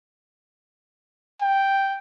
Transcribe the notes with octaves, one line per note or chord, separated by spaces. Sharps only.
G5